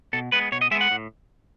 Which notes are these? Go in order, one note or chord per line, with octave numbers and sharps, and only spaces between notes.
B2 A4
G#3 B3 B4
B2 C#5
D#5
G#3 B3 E5
F#5
A2